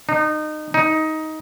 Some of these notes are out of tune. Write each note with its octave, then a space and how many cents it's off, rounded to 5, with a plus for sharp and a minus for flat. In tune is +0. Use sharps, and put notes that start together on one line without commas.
D#4 -25
D#4 +15